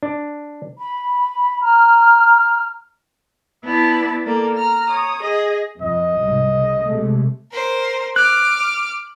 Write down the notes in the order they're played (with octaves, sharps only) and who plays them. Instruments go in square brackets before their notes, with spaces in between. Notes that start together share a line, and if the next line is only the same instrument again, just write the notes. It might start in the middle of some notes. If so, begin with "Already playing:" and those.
[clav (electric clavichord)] D4
[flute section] B5
A#5 F6
[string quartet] B3 E4 D5 A5
A#3 A4 A#4 D5
A#5 F6
C#5 D#6
G#4 D#5
[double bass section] F2 [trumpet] D#5
[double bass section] C2 G#2
C#3
C3 G#3 A3
[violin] A#4 C5
[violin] D6 F6 [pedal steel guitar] F#6